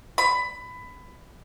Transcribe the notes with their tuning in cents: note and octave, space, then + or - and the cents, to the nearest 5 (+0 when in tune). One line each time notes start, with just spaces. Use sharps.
B5 +20